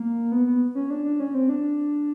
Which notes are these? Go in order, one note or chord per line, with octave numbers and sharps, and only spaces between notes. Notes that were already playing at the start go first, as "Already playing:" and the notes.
Already playing: A#3
B3
B3
C#4
D4
D4
C#4
C4
D4